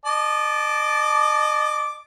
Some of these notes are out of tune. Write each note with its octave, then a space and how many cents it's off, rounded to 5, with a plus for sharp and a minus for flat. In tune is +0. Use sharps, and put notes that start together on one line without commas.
D#5 -35 A5 -20 D6 +0